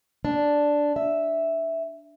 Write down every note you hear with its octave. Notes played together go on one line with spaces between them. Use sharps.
D4
E5